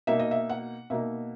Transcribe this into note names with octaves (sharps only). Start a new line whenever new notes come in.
B2 A#3 D#4 E5
D#5
E5
F#5
B2 A#3 D#4 E5